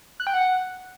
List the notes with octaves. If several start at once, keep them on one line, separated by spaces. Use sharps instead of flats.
F#6
G5
F#5